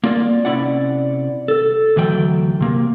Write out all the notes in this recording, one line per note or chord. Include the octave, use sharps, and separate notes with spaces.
A#3 F4 D5
C3 F#3 C#4 E4 D5 F#5
A4
D2 E3 F#3 G5
C3 A#3